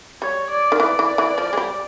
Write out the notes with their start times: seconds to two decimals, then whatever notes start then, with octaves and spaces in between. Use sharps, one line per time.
0.22 G3 C#5
0.50 D5
0.72 D#3
0.79 E3 D5
0.99 E3
1.18 E3
1.38 F3
1.53 G#3
1.57 G3